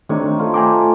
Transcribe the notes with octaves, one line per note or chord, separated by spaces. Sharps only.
C3 D#3 A3 D4 D#4 C#5
A3 F4
G5 G#5 A#5 D6